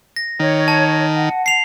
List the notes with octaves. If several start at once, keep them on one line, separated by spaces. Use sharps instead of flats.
A#6
D#3 C#5
A5
F#5
C7 F7